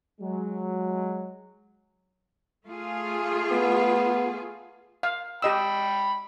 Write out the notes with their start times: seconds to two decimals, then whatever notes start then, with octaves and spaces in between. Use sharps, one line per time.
0.21 F#3 G#3
2.64 A3 F4 G#4
3.52 B3
5.03 F5
5.42 G4 D#5 G5 B5 E6